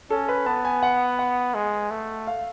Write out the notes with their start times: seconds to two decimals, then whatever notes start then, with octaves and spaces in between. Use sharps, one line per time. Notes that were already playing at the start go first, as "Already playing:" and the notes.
0.10 C#4 A4
0.28 B4
0.46 B3 A5
0.65 G#5
0.83 F#5
1.19 F#5
1.55 G#3
1.91 A3
2.27 F5